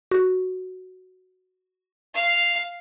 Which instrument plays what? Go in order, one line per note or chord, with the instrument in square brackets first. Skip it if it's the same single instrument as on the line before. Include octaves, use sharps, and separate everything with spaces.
[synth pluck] F#4
[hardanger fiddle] F5